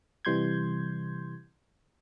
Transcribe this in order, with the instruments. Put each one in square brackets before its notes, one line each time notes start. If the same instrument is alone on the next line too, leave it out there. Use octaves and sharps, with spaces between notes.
[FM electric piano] C3 E3 G3 C6 G6 G#6